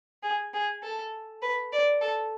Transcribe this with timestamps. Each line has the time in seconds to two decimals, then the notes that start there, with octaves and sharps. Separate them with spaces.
0.23 G#4
0.54 G#4
0.83 A4
1.42 B4
1.72 D5
2.01 A4